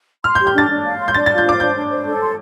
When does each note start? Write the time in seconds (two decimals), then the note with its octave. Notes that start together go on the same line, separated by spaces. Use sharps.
0.24 C6 F6
0.35 G6
0.40 G4
0.47 G6
0.54 D4 A6
0.70 D4
0.85 F5
0.99 C6
1.08 G6
1.14 D4 A6
1.26 A6
1.29 F4
1.38 G6
1.45 C5 D6
1.60 D4 G6
1.76 D4
1.90 C5
2.06 A4
2.21 C6